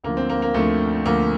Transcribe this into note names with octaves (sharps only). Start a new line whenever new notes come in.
D2 D3 F3 A#3
C4
A#3
A#3
D2 D3 F3 A3
D2 D3 F3 A#3